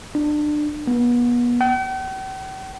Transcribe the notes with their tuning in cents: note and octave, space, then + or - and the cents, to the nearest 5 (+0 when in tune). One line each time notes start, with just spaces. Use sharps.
D4 +25
B3 -35
G5 -45